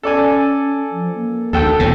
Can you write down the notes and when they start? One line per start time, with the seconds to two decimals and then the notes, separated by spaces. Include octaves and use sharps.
0.03 C#4 A4 D5 G#5
0.91 F3
1.15 A#3
1.53 D2 A4 G5
1.79 E1 A2